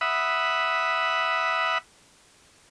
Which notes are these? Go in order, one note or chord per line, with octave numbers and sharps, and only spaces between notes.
E5 F#5 B5 D#6